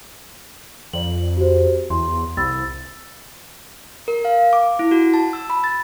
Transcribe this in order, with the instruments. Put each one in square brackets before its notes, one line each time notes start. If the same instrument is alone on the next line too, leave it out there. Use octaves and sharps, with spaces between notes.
[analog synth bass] F2 [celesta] D5 F#7
[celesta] F#4 G4 C5
[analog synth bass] E2 [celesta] C6
[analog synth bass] C2 [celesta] B5 E6 A6
[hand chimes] A#4
F5
D6
E4
F#4
A5
E6
B5
A6